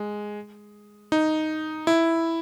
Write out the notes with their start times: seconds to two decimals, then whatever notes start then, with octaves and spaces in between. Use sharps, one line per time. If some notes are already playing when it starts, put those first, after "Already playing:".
Already playing: G#3
1.12 D#4
1.87 E4